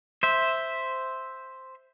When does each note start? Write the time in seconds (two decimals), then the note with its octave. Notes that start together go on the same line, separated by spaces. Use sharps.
0.23 C5 E5